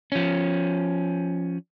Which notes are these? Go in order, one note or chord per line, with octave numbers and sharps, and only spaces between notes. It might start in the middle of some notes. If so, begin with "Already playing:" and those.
F3 C#4